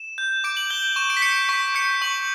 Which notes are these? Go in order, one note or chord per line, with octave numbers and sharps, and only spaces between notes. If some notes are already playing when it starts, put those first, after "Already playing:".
Already playing: E7
G6
D6 D7
F#7
G6 G7
C#6 E7
D7
B6
G6 C#7
C#7
C#6 B6
G6 C#7
C#6 F#7